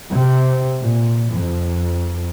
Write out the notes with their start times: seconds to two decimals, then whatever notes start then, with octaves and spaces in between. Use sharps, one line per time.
0.11 C3
0.81 A#2
1.30 F2